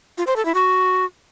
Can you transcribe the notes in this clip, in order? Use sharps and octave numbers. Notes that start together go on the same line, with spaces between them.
F4
C5
A4
E4
F#4